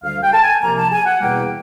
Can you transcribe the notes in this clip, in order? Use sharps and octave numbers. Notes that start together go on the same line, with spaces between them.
D2 D3 G3 F5
G5
A5
G#5
C2 C3 F3 A#3 A#5
A5
G#5
F#5
E2 B2 G3 A#3 G5